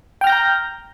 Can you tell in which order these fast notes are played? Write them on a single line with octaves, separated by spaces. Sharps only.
G5 F6 A#6 G6 A#5